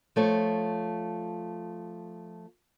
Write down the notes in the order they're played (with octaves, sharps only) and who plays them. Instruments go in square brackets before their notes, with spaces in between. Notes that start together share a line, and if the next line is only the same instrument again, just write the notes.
[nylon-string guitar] F3 A3 C#5